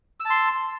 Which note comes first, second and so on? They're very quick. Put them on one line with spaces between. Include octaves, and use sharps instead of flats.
E6 A5 C6